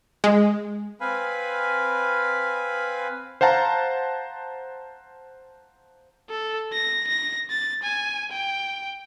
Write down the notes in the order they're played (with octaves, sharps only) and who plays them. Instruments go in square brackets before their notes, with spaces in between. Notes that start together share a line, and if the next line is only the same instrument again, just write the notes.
[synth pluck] G#3
[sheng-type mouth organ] C4 B4 F5 G#5 B5
[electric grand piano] C5 F5 F#5 A5 A#5
[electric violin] A4
A#6
A#6
A6
G#5
G5